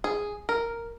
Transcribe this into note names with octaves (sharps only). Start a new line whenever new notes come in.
G#4
A#4